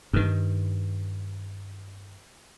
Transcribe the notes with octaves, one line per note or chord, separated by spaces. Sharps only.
G2 D#3